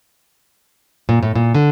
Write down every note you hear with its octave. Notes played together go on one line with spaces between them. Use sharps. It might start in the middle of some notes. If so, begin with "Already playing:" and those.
A#2
A2
A#2
D3